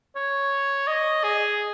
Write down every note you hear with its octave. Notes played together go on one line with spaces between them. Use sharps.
C#5
D#5
G#4